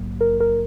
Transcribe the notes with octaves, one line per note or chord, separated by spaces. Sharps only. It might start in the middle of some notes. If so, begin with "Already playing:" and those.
Already playing: A#1 G#2 F#3 A#3
A#4
A#4